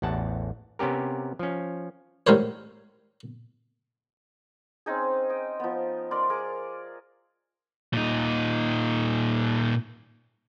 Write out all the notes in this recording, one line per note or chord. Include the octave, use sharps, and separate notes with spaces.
A1 E2 F#5 A5
C3 B3 C#4 G4 A#4
F3 C#4
A1 G#2 G3 A#4 C5 C#5
C4 C#4 D#4 G#4
D#5 G5
F3 B3
A#4 D5 C6
G#4 A#4 D6
A#2 D#4